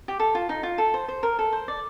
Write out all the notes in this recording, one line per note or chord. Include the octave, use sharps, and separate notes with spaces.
G4
A4
F4
D#4
F4
A4
C5
C5
A#4
A4
C5
D5